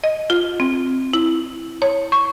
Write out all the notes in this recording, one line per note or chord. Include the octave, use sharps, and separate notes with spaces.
D#5
F4
C4
E4
C#5
C#6